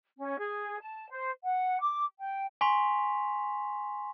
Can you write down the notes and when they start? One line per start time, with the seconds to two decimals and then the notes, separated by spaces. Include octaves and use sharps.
0.18 C#4
0.38 G#4
0.81 A5
1.09 C5
1.43 F#5
1.82 D6
2.19 G5
2.61 G#5 C6 C#6 B6 F7